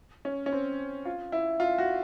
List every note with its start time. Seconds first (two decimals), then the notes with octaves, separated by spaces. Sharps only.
0.25 C#4
0.46 C#4
0.52 C4
1.05 F4
1.32 E4
1.60 F4
1.78 F#4